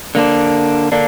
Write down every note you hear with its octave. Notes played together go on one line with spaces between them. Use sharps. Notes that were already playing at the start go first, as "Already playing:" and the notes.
D3 A#3 D4
D3 A#3 D4